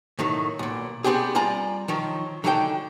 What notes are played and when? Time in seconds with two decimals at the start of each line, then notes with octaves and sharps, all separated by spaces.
0.19 A2 D#3 F#3
0.59 B1 A#2
1.04 B3 C4 D4 G4 G#4
1.35 G3 F4 D5 G#5 A#5
1.88 D#3 F3 F#3
2.44 D3 F#3 D#4 A4 D#5 G5